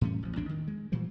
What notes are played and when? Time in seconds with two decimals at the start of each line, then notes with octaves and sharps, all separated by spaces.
0.01 A2 E3 G3 C#4
0.23 A1 F3
0.36 A#1 E2 A2 D4
0.49 D#3
0.68 G#3
0.92 A#2 E3 F3 G3